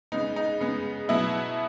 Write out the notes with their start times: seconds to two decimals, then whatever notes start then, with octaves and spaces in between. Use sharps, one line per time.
0.12 C#3 G#3 B3 D#4
0.36 D#4
0.60 C#3 G#3 B3
1.09 B2 F#3 B3 E4